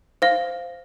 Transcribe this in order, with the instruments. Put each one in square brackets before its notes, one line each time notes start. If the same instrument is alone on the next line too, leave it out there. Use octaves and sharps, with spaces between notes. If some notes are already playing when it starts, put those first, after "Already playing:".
[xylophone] C5 F5